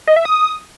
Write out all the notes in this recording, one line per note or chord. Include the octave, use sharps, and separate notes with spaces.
D#5
E5
D#6